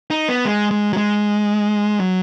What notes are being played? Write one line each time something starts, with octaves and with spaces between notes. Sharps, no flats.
D#4
B3
G#3
G#3
F#3
G#3
F#3